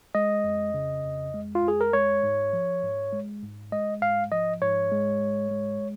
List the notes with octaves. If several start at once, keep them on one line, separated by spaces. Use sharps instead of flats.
G#3 D#5
F2
C#3
F2
G#3
F4
F2 G#4
A#4
G#3 C#5
G#2
F3
G#2
G#3
G#2
G#3 D#5
G#2 F5
F3 D#5
G#2 C#5
G#3
G#2
G#3